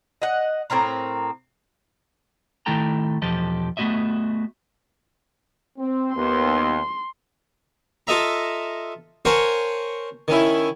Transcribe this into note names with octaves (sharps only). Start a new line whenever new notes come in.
D#5 F#5
A2 C4 A#4 A#5
D#3 A3 E4 A4 G5 A#5
B1 E2 F3 G4 A4 D#5
A3 B3 C4 F#4 D#5 E5
C4
D#2 B3 C6
F4 A4 D#5 E5 A#5
A#4 C5 C#5 F#5 G#5 A5
D#3 C#4 E4